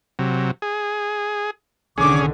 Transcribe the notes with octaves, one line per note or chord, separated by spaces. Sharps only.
C3 F#3
G#4
C2 D3 D#3 C#4 G#4 D6